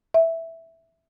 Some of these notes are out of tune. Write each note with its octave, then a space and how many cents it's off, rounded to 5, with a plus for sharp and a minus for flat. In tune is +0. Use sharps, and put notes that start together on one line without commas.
E5 +0